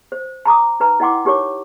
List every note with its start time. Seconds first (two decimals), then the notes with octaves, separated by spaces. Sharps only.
0.12 C5
0.45 A5 A#5 D6 D#6
0.80 D#4 B4 A#5
1.00 E4 D#5 F#5 G5 C6 D6
1.25 D#4 G4 A#4 C#5 D6